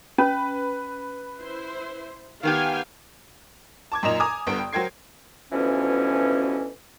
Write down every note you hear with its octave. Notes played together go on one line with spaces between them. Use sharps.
C#4 B4
E4 C5
D#3 B3 G4 F5 G5 G#5
A5 D6 G#6
F#2 A#2 D#4 D#5 E7 F7
G#5 A#5 D6 D#6
G1 G2 B3 D7
G5
F#3 A#4 C5 G5 G#6 C7
D2 B2 E3 F3 C#4